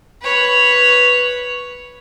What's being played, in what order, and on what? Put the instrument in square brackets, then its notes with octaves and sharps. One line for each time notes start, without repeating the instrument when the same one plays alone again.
[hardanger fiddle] B4 C#5